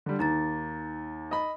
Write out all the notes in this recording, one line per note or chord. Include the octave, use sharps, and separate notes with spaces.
D3 G3
D#2 D#4 A#5 A6
D#5 B5